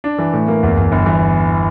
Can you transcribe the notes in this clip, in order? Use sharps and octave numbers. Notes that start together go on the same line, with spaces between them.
D4
E3
A2
A#3
E2
E2
G1
E3